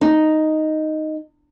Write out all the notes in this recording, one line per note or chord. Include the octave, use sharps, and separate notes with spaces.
D#4